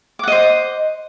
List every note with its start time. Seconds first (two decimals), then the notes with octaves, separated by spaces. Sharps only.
0.19 D6
0.23 F#5
0.28 D#5
0.32 C5